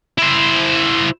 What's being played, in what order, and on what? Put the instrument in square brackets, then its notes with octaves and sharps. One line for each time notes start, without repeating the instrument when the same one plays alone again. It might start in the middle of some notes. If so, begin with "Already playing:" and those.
[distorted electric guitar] E4 C5